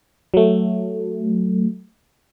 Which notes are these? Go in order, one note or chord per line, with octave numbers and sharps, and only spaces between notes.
F#3 A3